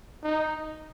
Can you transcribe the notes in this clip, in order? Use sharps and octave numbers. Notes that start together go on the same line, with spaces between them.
D#4